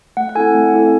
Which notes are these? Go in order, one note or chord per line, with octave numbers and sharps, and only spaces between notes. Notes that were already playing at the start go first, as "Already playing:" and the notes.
A3 F#5
F#5
C4 E4 A4 G#5
A3
C4 E4 A4